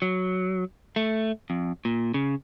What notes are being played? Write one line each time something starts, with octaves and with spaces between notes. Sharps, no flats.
F#3
A3
F2
A#2
C#3